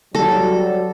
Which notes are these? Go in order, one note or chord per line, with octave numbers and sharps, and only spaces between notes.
F#3 G3 A4